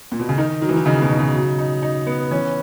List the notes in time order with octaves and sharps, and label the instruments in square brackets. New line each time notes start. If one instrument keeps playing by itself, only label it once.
[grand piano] A#2
B2
C#3
[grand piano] D#3 [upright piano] D#4
[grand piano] D#3 [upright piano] F#3
[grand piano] E3
D#3
[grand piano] C#3 [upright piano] D#4
[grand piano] B2
[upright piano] D#4
[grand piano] C#3
[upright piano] F#3
D#4
D#4
B3
[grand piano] E3 [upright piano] C#4